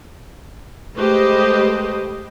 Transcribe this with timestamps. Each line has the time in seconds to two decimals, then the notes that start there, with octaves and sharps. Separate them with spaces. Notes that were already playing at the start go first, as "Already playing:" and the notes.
0.97 G#3 A3 G4 B4 C5 D#5